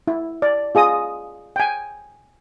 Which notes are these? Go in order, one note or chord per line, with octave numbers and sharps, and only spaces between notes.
E4
D5
F4 G#4 D#5 D#6
G5 G#5